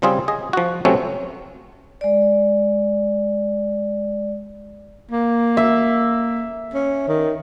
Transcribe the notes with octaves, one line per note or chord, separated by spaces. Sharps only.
C#3 G3 C4 F4 G#4
G#4 D#5
F3 F#4
C3 F#3 A3 C4 C#4
G#3 D5
A#3
E5
C#4
D#3